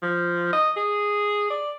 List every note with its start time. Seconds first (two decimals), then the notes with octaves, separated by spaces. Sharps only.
0.02 F3
0.53 D#5
0.76 G#4
1.50 D5